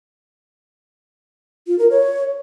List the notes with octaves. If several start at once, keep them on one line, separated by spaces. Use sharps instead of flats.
F4
A#4
C#5